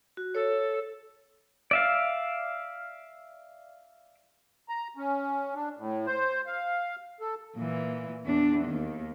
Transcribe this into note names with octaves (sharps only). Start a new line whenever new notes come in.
F#4
A4 C#5
D5 E5 F5
A#5
C#4
D4
A2
C5
F5
A4
A#2 E3
E2 D4
D#2 D#3